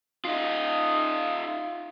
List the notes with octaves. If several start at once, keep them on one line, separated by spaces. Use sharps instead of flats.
D#4 F4